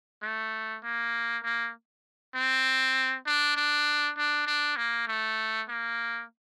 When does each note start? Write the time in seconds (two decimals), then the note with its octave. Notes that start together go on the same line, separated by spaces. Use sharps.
0.22 A3
0.83 A#3
1.43 A#3
2.35 C4
3.26 D4
3.56 D4
4.17 D4
4.47 D4
4.77 A#3
5.08 A3
5.68 A#3